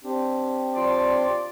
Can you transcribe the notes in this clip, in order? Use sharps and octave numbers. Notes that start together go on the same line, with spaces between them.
C4 D4 G4
F3 D5 C6